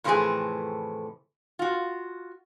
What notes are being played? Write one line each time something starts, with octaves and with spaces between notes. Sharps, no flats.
F2 A2 C3 E3 A3 G#4
F4 F#4